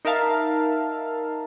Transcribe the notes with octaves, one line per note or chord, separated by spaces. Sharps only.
D#4 A#4 E5 F5 A5